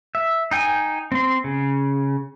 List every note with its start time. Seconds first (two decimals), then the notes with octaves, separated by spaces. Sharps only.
0.15 E5
0.51 D#4 G5 G#5
1.12 C4 C6
1.44 C#3